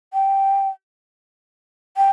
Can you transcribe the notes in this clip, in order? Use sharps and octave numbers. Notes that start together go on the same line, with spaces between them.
G5
G5